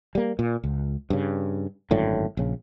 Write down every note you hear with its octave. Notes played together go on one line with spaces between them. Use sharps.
G3 A#3
A#2
C#2
G2 C#3
G#1 F#2 A2 D3
A#1 C#3